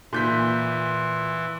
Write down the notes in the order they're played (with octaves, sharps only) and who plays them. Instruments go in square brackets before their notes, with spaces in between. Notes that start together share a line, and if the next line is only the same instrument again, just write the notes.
[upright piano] A#2 G6 B6 [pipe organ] E3